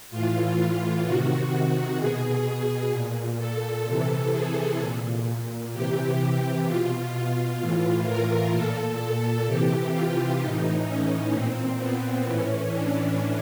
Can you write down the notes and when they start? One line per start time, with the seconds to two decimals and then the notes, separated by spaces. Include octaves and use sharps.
0.11 A2 E3 F4
1.04 C3 D#3 F#4
1.98 B2 G#4
2.91 A#2
3.38 A4
3.85 C3 E3 A4
4.32 G#4
4.79 A#2
5.73 C3 E3 G4
6.65 B2 F4
7.12 F4
7.59 A2 E3 F4
8.06 A#4
8.52 A#2 A4
9.00 A4
9.46 C3 E3 G4
9.92 F4
10.39 A2 E3 D#4
10.87 C#4
11.33 A#2 C4
11.80 B3
12.26 A2 E3 C#4
12.73 D4